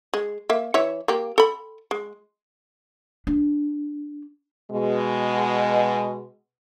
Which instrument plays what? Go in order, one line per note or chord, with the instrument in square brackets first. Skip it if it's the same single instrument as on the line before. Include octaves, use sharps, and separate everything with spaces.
[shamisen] G#3
A#3 E5
E3 C#5 E5
A#3 G4
A4 B5
G#3
[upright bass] D4
[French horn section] B2 G#3